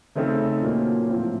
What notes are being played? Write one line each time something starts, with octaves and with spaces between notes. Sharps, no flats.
C#3 A3 C4 D#4 A4
A#2 F#3 A#3 C#4
A2 F3 C4 F4